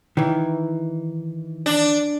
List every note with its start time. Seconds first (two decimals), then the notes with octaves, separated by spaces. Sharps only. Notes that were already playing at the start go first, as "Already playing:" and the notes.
0.17 D#3 E3
1.66 D4